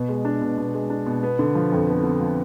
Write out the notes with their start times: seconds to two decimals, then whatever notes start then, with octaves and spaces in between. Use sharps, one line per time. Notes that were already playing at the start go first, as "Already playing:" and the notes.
Already playing: B2
0.09 G#3
0.25 D4
0.42 B2
0.58 B2
0.74 G#3
0.90 D4
1.06 B2
1.23 B3
1.39 D3
1.55 F3
1.72 F2
1.87 B3
2.03 D3
2.20 F3